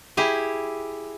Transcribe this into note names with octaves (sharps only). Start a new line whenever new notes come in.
E4 G4 G#4